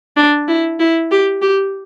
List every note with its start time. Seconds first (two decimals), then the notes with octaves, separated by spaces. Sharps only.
0.17 D4
0.48 E4
0.79 E4
1.11 G4
1.42 G4